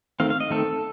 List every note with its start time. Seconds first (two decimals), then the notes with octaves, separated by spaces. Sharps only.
0.20 D#3 A3 C4 F5
0.30 F5
0.40 D#5
0.50 D#3 A3 C4 A4